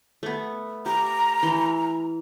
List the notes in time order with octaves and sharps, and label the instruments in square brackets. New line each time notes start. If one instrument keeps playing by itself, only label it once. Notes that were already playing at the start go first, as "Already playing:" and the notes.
[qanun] A3 B3
[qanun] G4 [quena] A#5
[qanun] E3 C6